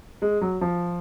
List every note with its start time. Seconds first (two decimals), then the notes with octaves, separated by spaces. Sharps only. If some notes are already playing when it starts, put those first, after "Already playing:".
0.22 G#3
0.41 F#3
0.61 F3